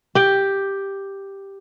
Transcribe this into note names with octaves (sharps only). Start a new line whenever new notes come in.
G4 G5